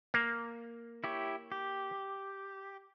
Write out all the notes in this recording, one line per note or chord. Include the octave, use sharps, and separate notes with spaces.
A#3
E4 G4 C#5
G4